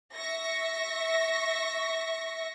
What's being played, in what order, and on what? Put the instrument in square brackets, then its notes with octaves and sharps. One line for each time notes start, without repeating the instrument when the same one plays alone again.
[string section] E5 C#6 A#6